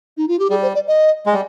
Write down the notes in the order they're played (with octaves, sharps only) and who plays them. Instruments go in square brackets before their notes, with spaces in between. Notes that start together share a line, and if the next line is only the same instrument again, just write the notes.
[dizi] D#4
F4
G4
[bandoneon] G3 [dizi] G#4
[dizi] C5
D5
D#5
[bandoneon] G#3
G3